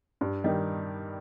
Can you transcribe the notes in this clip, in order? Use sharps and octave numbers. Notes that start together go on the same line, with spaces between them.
G2
D#3 G3 D#4